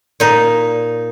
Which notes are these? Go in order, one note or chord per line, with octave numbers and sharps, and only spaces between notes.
A#2 D#4